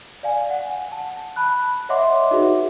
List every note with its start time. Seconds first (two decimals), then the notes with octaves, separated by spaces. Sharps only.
0.23 D5 F5 G#5
0.50 F#5
0.92 A5
1.36 A5 B5 F#6
1.89 C#5 D#5 E5 F#5 C6 D6
2.31 D#4 F#4 G#4 B4 E5